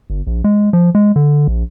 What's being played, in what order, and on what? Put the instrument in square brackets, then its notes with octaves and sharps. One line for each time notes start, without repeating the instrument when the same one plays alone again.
[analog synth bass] G1
A#1
G#3
F3
G#3
D3
A#1